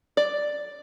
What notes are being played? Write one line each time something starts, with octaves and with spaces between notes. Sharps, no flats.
D5